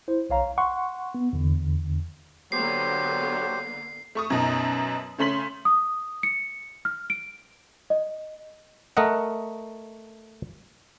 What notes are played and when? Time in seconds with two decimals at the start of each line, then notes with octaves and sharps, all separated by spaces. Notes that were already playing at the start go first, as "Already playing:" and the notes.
0.08 E4 C5
0.30 B1 C#5 F5 A#5
0.58 F#5 C6 C#6
1.15 B3
1.33 E2 D3
2.52 D3 F#3 A#3 B3 G4 C5 C7
4.15 A3 C#6 D#6
4.30 F#2 B2 D#4
5.18 C#3 A3 C#4 C6 B6 F#7
5.65 D#6
6.23 C#7
6.85 F6
7.10 D7
7.90 D#5
8.97 A3 A#4 D#5 F#5